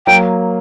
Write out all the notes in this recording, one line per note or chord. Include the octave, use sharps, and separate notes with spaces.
F#3 A#3 G5